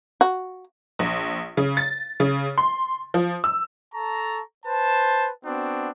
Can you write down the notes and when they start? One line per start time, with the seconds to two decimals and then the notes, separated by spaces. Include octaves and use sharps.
0.21 F#4
0.99 A#1
1.57 C#3
1.77 A6
2.20 C#3
2.58 C6
3.14 F3
3.44 E6
3.94 A4 A5 A#5 C#6
4.66 B4 C5 A5
5.45 B3 C4 D4 F#4